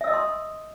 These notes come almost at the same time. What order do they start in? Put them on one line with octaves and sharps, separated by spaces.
E5 E6 D#5 D#6 C6